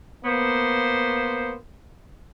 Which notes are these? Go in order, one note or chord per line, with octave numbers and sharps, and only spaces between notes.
A#3 B3 C5